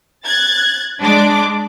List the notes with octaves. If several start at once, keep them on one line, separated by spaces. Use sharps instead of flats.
F#6 G#6 A6
G#3 D4 D6